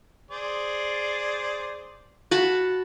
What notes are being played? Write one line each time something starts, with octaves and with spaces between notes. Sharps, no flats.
G#4 C5 D5
F#4 A5 B5